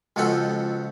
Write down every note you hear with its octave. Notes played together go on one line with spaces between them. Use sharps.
C#2 B2 F3 C4 A4 F#5